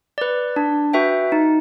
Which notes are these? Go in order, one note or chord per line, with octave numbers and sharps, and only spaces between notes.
B4 D5
D4
F#4 B4 E5 G5
D#4